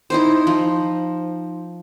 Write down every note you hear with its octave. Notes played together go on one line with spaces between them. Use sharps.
D#4 E4 C5
F3